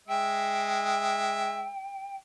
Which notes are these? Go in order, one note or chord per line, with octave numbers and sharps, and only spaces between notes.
G#3 E5 G5